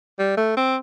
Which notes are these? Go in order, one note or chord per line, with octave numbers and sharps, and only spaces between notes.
G3
A3
C4